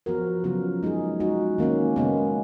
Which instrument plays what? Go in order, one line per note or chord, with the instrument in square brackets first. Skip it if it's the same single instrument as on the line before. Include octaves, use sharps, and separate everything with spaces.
[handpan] F3 B3 F#4 A#4
C#3 F#3 B3 F4 A#4
G#3 D#4 G#4
G#3 D#4 F#4
D#3 A#3 C#4
C#3 G#3 B3